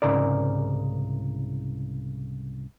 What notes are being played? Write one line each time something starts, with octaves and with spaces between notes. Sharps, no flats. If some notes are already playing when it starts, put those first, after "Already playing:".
C2 G#2 C#3 A#4 D5